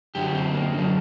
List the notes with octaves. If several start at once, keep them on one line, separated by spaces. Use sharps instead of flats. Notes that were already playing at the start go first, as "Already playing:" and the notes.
F#2 D3 F#3 G4
C4
A#3
F#2 D3 F#3